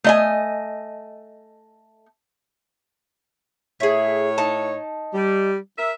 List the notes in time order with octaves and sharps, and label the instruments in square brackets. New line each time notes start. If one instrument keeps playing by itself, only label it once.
[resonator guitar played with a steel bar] A3 D#5 G#5
[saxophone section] A2 C#5 [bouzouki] G#4 E5
[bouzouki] D#4 A5
[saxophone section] G3
A#4 E5